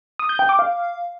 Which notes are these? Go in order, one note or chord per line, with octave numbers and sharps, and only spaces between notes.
D#6
G6
G5
D6
F5